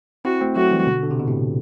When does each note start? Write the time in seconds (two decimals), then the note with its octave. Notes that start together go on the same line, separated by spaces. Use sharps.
0.25 C4 E4 F#4
0.41 A3 C4
0.56 F#3 A3 F#4
0.71 E3 G3
0.87 B2 D3
1.03 D3
1.11 C3
1.20 B2
1.28 A2 C3